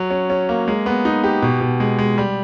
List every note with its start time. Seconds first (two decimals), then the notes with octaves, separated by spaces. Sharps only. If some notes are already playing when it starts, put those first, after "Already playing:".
Already playing: F#3
0.10 C#4
0.30 C#4
0.49 A#3
0.68 G#3
0.86 B3
1.05 D#4
1.24 G4
1.42 B2
1.61 B2
1.80 G#3
1.99 G#3
2.18 G3